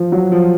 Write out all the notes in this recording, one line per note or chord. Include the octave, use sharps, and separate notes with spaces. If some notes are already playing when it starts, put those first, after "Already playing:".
Already playing: F3
F#3
F3